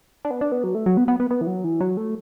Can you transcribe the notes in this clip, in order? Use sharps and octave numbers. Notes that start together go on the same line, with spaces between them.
D4
B3
D4
B3
F#3
A3
F#3
B3
B3
B3
B3
E3
F#3
E3
F#3
A3